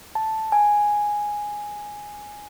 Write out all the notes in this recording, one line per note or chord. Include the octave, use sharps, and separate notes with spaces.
A5
G#5